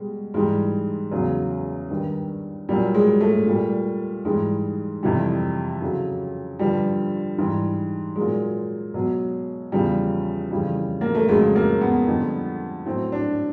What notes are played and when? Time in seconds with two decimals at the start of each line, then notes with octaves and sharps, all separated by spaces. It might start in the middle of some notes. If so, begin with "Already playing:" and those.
Already playing: B2 G3 G#3
0.34 G#2 E3 G3 G#3
1.11 E2 C#3 F#3
1.90 G2 D#3 G3
2.69 A#2 F#3 G3
2.94 G#3
3.20 A3
3.46 A#2 G3
4.25 G#2 E3 G3 G#3
5.03 F2 C3 E3 G3
5.82 F2 C#3 F#3
6.59 G2 D3 F3 G3
7.38 G#2 E3 G3
8.16 A#2 F#3 G#3
8.94 B2 F#3
9.72 E2 C#3 F3 G3
10.51 F2 C#3 E3 G3
11.01 A#3
11.15 A3
11.28 F2 C#3 F#3 G#3
11.56 A#3
11.81 B3
12.07 F2 D3 G3
12.85 A2 F#3 C4
13.12 D4